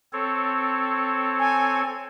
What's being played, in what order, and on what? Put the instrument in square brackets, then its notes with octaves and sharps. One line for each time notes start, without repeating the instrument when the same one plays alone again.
[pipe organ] C4 A4 C#5
[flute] G#5